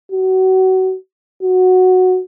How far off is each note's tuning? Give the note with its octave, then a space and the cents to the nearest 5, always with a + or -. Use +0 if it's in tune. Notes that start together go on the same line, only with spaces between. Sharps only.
F#4 +25
F#4 -5